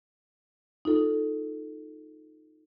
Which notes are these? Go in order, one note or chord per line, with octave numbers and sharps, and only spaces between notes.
D#4 F4 A4